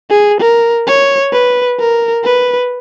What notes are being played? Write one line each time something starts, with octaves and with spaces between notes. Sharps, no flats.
G#4
A#4
C#5
B4
A#4
B4